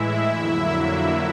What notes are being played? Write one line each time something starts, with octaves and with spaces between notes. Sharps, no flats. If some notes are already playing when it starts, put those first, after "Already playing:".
Already playing: A2 E3 G#3 E4 E5
F2 D3 F#3 A#3